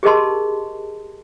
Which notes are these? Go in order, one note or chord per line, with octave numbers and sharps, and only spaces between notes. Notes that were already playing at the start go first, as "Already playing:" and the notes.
G4 G#4 A#4 D#5 A5 C6